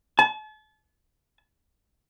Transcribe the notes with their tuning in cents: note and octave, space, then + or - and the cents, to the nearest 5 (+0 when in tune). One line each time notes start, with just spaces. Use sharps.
A5 -40